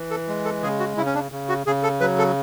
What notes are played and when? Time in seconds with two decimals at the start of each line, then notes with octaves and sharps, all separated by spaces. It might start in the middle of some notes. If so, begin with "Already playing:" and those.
Already playing: E3
0.11 A4
0.28 G#3
0.45 A4
0.63 C#3 G#4
0.80 F#4
0.97 C#3 E4
1.06 C#4
1.15 D4
1.32 C#3
1.49 F#4
1.66 C#3 G#4
1.83 A4
2.00 F#3 B4
2.18 A4